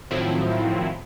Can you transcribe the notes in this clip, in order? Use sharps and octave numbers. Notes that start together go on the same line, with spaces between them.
A2 D#3 F3 F#3 C4 E4